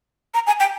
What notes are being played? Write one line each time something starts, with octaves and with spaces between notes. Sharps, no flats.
A#5
G#5
G5